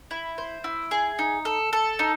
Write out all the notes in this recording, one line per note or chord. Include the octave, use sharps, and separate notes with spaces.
E4
C5
E4
G#4
D#4
A4
A4
D#4